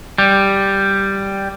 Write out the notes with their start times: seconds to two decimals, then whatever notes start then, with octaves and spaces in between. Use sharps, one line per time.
0.18 G3